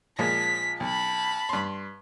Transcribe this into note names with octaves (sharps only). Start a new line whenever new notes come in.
A#2 F3 G#3 B6
B1 A5 B5
G2 C6